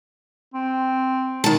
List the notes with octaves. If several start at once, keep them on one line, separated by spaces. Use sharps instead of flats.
C4
D#3 A5